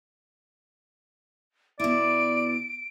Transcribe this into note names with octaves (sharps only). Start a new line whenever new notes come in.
B2 E4 D5 D7